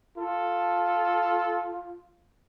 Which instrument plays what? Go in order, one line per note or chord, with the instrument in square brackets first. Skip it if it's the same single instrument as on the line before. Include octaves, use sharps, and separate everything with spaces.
[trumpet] F4 [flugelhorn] A4